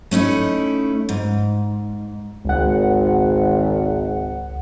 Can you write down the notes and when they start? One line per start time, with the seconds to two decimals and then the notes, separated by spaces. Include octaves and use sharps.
0.11 A3 C#4 D#4 E4
1.09 G#2
2.45 G#1 C#2 F#5